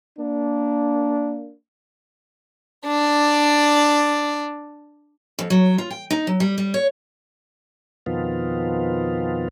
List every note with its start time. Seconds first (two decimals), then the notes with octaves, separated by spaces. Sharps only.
0.18 A#3 D4
2.86 D4 D5
5.39 F2
5.50 F#3
5.78 F4
5.91 G5
6.11 D#4
6.27 F#3
6.40 G3
6.58 G3
6.74 C#5
8.06 F2 B2 D#3 F3 B3 F4